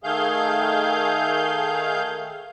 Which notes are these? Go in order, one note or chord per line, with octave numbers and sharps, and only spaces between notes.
D#3 A3 G#4 F5 G6